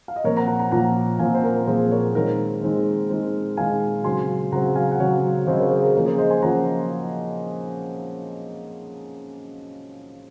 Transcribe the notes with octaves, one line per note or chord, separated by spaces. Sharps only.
F5
D#5
A#2 F3 C4 A#4 C#5
F#5 A#5
F#5 A#5
F#5 A#5
A#2 F3 C4 F#5 A#5
A#2 F3 C4 F5 G#5
C5
A#4
A#2 F3 C4 G#4 C5
A#4 C#5
D#3 G#3 C4 A#4
D#3 G#3 C4
D#3 G#3 C4
D#3 G#3 C4 F5 G#5
C#3 F#3 C4 G#5 C6
C#3 F#3 C4 F#5 A#5
F5 G#5
F#5
C#3 F#3 C4 C#5 F5
C#3 F#3 C4 C5 D#5
A#4 C#5
G#4 C5
A#4
F3 A#3 C#4 A#4
G#4 C5
C5 D#5
G#5 C6
F3 A#3 C#4 F#5 A#5